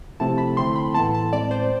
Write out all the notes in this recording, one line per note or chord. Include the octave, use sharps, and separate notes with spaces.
C3 F3 A3 C4 E4 A5
B5
D3 A3 C4 E4 C6
B5
A2 E3 B3 E4 A4 A5
A5
A2 G#3 C4 D5
C5